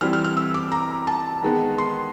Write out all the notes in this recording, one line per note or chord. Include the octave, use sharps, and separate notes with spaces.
E3 G3 C4 F6
F6
F6
E6
D6
A#5
A5
D#3 G#3 B3
C6